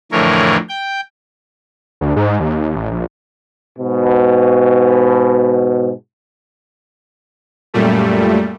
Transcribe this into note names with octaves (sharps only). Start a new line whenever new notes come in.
F2 A2 D3 E3 A#4 C#5
G5
D2
G#2
D#2
A1
A#1
G#2 B2
F#2 A#2 G3 A3